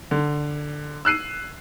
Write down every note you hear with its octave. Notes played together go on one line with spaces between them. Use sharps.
D3
E6 F#6 C7 D#7